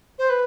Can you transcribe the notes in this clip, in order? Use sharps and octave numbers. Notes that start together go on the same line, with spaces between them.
C5
B4